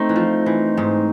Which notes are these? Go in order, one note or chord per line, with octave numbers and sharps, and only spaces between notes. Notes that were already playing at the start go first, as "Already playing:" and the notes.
Already playing: A3 C4 D#4
E3
F3
E3
G#2 G#3